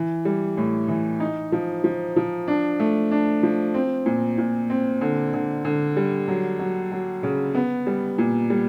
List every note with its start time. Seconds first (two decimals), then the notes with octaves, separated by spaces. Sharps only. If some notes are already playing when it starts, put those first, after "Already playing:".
Already playing: E3
0.25 G3
0.57 A2
0.88 E3
1.20 D#4
1.52 F3
1.84 F3
2.16 F3
2.48 D4
2.80 A3
3.11 D4
3.43 F3
3.74 C4
4.06 A#2
4.38 A#2
4.70 C4
5.01 D3
5.33 D3
5.65 D3
5.97 G3
6.28 F#3
6.59 F#3
6.92 F#3
7.23 C#3
7.55 B3
7.87 G3
8.18 A#2
8.50 G3